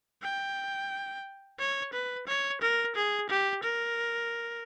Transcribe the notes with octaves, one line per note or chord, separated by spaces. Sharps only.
G5
C#5
B4
C#5
A#4
G#4
G4
A#4